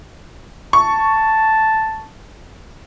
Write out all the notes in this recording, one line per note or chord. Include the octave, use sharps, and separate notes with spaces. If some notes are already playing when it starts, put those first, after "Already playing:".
A5 C#6